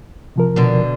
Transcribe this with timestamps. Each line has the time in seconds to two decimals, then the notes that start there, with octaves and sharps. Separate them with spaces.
0.36 C3 F3 A#4
0.56 B2 D3